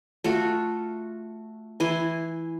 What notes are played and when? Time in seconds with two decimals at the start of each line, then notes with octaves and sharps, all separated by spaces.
0.24 A3 F4 F#4
1.80 E3 E4 G#5 C6